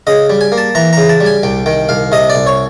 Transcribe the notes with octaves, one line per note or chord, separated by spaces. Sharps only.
C#3 D#5
G3
G#5
A#3
A5
E3 A#5
C#3 A#5
A5
G3
G#5
C2 G5
D#3 G5
C2 F5
C3 D#5
D5
C2
C#5